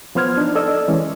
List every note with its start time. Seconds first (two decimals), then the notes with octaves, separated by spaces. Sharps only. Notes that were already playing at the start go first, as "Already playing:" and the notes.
0.15 F3 B3 C5 F6 G#6
0.38 D4 D#4
0.55 A4 D5 D#5 E6
0.88 E3 G#3 C#4